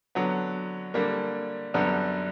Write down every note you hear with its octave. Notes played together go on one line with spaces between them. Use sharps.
D3 F#3 B3
D3 G3 A#3
F#2 D3 G3 B3